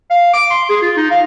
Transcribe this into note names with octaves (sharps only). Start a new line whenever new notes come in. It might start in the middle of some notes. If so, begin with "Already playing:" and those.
F5
D6
C6
G#4
F4
D#4
F5